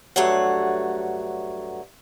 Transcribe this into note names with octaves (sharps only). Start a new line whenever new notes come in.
G2 F#3 A3 C#5 F#5